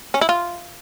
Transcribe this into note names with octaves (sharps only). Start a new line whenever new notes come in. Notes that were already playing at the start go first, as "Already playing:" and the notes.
C#4
E4
F4